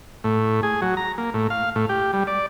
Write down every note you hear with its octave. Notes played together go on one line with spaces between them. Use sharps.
A2
G#4
F#3
A#5
A#3
A2
F5
A2
G4
G3
D5